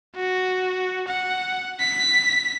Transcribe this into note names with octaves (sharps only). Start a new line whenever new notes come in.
F#4
F#5
B6